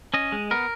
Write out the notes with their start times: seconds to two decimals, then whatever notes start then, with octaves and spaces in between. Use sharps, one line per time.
0.14 C#4 D#5
0.32 G#3
0.51 B3 A#4